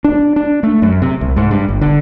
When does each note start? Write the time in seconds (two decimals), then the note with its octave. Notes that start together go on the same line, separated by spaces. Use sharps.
0.04 D4
0.36 D4
0.63 A3
0.82 F#2
1.02 C3
1.21 C2
1.37 G#2
1.51 G2
1.69 G1
1.81 D3